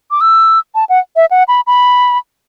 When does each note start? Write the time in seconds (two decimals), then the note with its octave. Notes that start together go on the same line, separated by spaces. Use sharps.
0.11 D6
0.21 E6
0.75 A5
0.89 F#5
1.16 E5
1.31 F#5
1.48 B5
1.67 B5